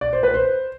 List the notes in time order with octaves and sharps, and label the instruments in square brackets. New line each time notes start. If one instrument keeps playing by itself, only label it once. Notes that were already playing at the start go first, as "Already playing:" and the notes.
[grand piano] D5
C5
B4
C5